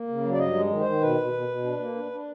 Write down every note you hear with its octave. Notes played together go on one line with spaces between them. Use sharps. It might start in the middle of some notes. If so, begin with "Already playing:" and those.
Already playing: A#3
C#3
F#3
D5
G2 D#5
G#3
D#3
C5
D#3
B2 B4
B2
B2
B2
D4
A#3
D4
D4